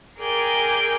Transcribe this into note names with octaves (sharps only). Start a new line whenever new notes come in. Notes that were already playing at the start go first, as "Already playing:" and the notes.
G#4 A#4 D5 G5 G#5 G6